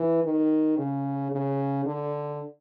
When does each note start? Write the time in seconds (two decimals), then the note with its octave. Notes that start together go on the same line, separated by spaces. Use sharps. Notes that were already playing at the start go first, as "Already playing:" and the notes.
Already playing: E3
0.24 D#3
0.77 C#3
1.31 C#3
1.86 D3